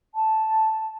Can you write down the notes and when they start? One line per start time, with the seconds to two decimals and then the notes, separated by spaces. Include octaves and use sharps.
0.15 A5